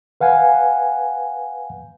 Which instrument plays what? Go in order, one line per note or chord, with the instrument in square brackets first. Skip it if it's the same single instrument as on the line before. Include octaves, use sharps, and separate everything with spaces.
[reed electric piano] B4 F5 F#5 G#5